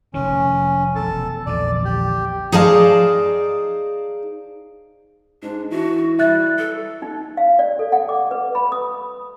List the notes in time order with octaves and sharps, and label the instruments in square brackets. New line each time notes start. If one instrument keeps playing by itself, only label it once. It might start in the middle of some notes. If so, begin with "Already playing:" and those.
[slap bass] F1 D#3 [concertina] C#4
[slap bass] E1 [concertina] A4
[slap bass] A#1 E2 D3 [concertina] D5
[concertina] G4
[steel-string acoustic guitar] D#4 G#4 C5 D5 F5 A5
[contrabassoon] G#2 [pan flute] D4
[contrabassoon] E3 [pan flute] F#4
[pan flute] G3 [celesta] E5 F#6 A6
[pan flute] A4
[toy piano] D#4
F5
D5
A4
F#5
D6
B4
B5
D#6